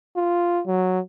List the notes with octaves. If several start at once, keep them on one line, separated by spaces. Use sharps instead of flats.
F4
F#3